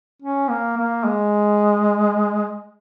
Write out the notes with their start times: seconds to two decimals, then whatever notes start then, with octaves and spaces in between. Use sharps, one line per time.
0.22 C#4
0.49 A#3
0.77 A#3
1.05 G#3